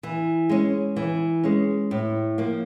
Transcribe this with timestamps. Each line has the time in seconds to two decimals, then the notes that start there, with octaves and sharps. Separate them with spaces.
0.03 E3
0.49 G#3 C#4
0.96 E3
1.44 G#3 C#4
1.91 A2
2.38 F3 A#3